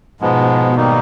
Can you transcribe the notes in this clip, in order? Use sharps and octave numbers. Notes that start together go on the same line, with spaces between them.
G#2 B2 F3 G#3 B3
G#2 D#3 G3 A#3 D#4